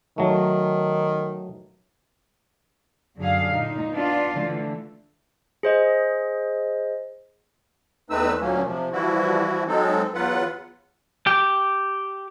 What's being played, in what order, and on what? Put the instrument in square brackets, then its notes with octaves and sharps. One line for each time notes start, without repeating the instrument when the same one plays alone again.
[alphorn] D#3 [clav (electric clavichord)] F#3 A3
[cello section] F#2 D3 G#4 F5
A#2 D#4
B3 D4 F4
D3 E3 A3
[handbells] G#4 C5 D#5
[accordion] E2 A3 C4 D#4 B4 E6
D2 A#2 F#3 A3 A#3 C#4
C3 F3
E3 F3 G3 E4 F#4
F#3 G#3 C4 D#4 A4
E2 F#3 F4 B4 F#5
[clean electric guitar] G4